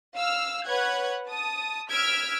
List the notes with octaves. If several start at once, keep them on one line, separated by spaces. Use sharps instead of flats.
F5 E6 F6
B4 C#5 F#5 F#6 G#6
A5 D#6
E6 F6 G#6 B6 D7